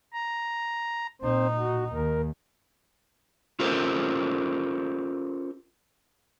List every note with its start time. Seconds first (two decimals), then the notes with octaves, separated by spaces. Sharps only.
0.13 A#5
1.22 A#2 C4 D#4 C5
1.58 F#4
1.94 D#2 A#4
3.60 C#4 F4 G4 A4 A#4 C5